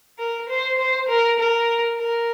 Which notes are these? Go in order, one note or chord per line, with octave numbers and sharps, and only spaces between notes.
A#4
C5
C5
A#4
A#4
A#4